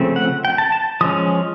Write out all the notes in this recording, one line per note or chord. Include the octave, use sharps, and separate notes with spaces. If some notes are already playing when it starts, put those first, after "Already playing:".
Already playing: C#3 F3 A3 C4
F#5
G5
A5
A5
F3 G#3 C#4 D#6